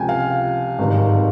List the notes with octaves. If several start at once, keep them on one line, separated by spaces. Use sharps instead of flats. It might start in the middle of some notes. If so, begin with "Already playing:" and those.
Already playing: C#2 C3 F3 G5 G#5
F5
G#1 G2 D#3